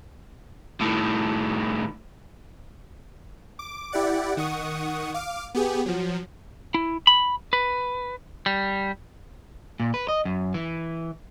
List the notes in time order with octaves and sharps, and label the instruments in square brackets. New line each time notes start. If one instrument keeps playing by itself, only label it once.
[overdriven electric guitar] A2 D#3
[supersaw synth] D6
E4 G4 D5 F#5
D#3 F#5 C#6 D#6
F5 D6
B3 G4 G#4
F3 F#3
[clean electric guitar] E4
B5
B4
G3
A#2
B4
D#5
F#2
E3